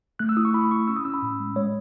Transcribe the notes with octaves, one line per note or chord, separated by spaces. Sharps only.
A3 F#6
E6
E4 D#6
C#6
E4 B5
E4 C#6
C#4 E6
D#6
C#4 E6
B5
A2
G#3
G#3 C#5